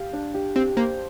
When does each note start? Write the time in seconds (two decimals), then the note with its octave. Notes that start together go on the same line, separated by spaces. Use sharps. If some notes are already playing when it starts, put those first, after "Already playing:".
Already playing: G4 F5
0.13 D4
0.34 G4
0.56 C4 G4
0.76 A#3 C5